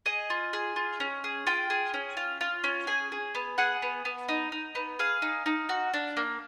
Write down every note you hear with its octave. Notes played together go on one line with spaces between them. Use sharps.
G#4 D#5
F4
G#4
F4
C#4
G#4
F4 G5
G#4
C#4
F4
F4
C#4
G#4 G#5
G#4
B3
G#4 F#5
B3
B3
D#4
D#4
B3
G#4 F5
D#4
D#4
F#4
D4
A#3